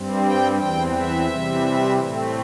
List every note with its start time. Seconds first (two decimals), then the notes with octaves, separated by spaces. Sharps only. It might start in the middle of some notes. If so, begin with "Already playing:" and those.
Already playing: G2 G3 C4
0.23 G5
0.58 E2 E3 C4 G5
0.95 E5
1.29 C3 E3 G3 C4
2.00 A2 A3 C4